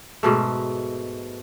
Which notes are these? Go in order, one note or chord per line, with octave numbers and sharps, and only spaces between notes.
G#2 B2 A3